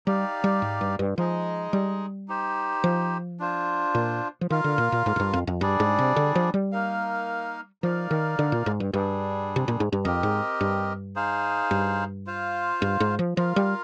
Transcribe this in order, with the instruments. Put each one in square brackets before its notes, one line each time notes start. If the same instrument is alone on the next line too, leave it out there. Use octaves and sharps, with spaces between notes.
[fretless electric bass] G3 [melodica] D#4 G4 D5 F5
[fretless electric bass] G3
G#2
G2
G2
[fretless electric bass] F3 [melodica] G#3 D#4 G#4 D#5
[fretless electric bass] G3
[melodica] D#4 G4 C5
[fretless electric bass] F3
[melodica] D4 F4 C5
[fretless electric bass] A#2
F3
[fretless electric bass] D#3 [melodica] F4 A#4 F5
[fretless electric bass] D3
A#2
A#2
G#2
G#2
G2
F2
F2
[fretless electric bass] G2 [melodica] G3 D4 G#4 D5
[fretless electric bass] G#2
C3
D3
F3
G3
[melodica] A#3 D#4 A#4 F5
[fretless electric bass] F3 [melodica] D#4 A#4 D5 F5
[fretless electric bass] D#3
D3
A#2
G#2
G2
[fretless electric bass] G2 [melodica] G3 D4 G#4
[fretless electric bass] C3
A#2
G#2
G2
[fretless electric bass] F2 [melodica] C4 G4 A#4 D#5
[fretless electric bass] G#2
G2
[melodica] D#4 G#4 C5 F5
[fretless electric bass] G2
[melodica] F4 C5 F5
[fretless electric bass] G2
G#2
F3
[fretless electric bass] F3 [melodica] F4 A#4 F5
[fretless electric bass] G3